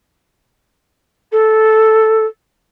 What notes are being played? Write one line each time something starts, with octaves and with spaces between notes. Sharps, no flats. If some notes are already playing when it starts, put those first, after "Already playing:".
A4